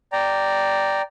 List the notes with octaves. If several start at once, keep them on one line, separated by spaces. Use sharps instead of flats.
D5 G5 A#5